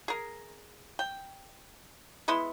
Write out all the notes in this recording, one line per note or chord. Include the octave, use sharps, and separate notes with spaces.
G#4 A#4
G5
G#3 B3 E4 C6